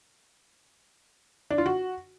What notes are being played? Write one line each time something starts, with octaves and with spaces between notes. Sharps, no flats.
D4
F4
F#4